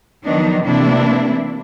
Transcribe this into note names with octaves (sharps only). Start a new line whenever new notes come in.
D#3 F3 F#3 B3 D4 D#4
C3 E3 A3 A#3 D4 E4